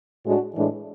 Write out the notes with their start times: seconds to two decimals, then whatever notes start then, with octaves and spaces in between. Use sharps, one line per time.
0.24 A2 G#3 D4 F#4
0.55 A2 E3 G#3 D4